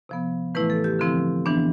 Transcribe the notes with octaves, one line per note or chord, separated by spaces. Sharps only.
C3 F3 B3
A2 E3 A3 E4 B4
A4
G4
D3 F3 C4 E4
E3 B3 D4